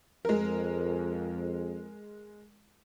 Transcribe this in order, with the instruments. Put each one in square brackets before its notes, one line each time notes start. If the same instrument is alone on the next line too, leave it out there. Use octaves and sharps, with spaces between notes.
[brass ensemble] F2 [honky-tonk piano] G#3 A#4